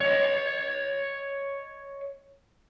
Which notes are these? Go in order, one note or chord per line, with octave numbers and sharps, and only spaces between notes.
C#5 D#5